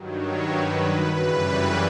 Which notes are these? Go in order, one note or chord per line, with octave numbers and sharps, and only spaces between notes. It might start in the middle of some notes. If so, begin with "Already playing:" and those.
Already playing: G2 D#3 F#3
C#5
B4
B4
F#2 C#3 E3 G3 B4